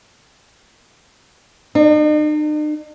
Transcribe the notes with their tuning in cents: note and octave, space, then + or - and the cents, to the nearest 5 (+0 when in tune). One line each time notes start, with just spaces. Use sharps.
D#4 -45